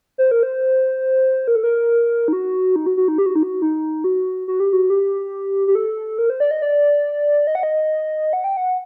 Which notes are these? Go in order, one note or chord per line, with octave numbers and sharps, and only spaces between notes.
C5
A#4
C5
A#4
A4
A#4
D#4
F#4
D#4
F#4
F#4
D#4
G4
F#4
D#4
F#4
D#4
F#4
F#4
G4
F#4
G4
G4
A4
A#4
C5
D5
D#5
D5
D#5
F#5
D#5
F#5
G5
F#5